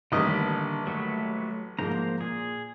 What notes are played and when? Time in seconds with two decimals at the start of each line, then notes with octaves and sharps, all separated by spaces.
0.12 A1 D3 D#3 G3 A#3 B4 D#5
0.87 F#3 A3 B4
1.79 G#2 F3 A#3 C5 A#5
2.21 A#2 G#4